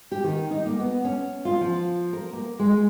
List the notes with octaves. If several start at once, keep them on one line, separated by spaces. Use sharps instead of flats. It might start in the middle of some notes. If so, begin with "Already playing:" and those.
G4
D#3
D#4
A#3
B3
C#4
F4
F3
A#4
A#3
G#3